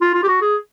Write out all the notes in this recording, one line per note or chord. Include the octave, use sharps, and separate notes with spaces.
F4
F4
G4
F#4
G#4